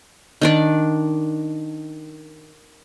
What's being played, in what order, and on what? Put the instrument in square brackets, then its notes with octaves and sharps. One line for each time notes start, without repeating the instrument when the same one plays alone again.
[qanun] D#3 D4 D5